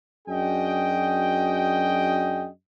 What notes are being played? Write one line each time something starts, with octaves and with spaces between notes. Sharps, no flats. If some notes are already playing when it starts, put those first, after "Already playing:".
F#2 D4 F#4 G#4 D#5 G5